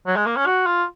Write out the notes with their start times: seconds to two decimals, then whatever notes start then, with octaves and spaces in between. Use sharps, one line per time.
0.07 F#3
0.17 G#3
0.26 A#3
0.37 C#4
0.46 F#4
0.66 F4